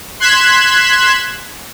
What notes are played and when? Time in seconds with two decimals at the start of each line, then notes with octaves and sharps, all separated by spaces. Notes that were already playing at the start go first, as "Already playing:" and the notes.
0.20 C6 F#6 G#6 B6 E7